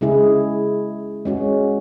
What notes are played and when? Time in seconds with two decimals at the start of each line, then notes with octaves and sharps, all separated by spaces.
0.01 C#3 G#3 E4 G#4
1.25 G#3 C#4 F#4